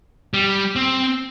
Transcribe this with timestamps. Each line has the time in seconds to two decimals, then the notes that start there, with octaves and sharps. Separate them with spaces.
0.34 G3
0.76 C4